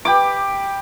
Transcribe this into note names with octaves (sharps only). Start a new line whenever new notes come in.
G4 B5 D6